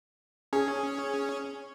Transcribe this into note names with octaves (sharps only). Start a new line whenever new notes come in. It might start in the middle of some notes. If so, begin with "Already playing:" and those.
C#4 G#4